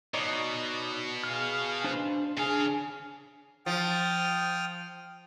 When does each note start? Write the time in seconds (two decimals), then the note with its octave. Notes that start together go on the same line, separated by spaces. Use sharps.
0.14 B2 D#4 C#5 D5
1.24 G#4 F5 F6
1.84 D4 C5
2.37 C#3 D4 G#4 F5
3.66 F3 G5 D#6 F6